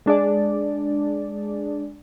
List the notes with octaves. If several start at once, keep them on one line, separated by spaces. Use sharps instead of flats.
G#3 D4 G#4 D5